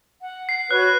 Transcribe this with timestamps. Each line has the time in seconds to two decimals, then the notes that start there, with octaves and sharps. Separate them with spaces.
0.22 F#5
0.49 C7
0.71 F#4 B4 C#5 F#6